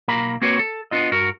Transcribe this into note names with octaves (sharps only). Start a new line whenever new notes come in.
B1 A#3 A#4 F5 A#5 B5
A#3 C4 F#4 B4 C#5
A4
B3 D4 F4 D#5
G2 F#4 A#4